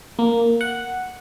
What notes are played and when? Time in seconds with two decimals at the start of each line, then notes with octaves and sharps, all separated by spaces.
0.19 A#3
0.61 F#5